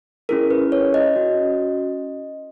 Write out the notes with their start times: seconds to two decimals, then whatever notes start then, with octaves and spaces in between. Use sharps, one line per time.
0.29 C#4 E4 G#4 A#4
0.51 B4
0.72 C#5
0.94 D#5
1.16 C#4 F#4